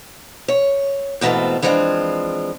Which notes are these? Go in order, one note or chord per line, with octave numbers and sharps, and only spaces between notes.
C#5
G#2 B2 E3 A3 C4 F4
E3 F3 G#3 C4 D4 F4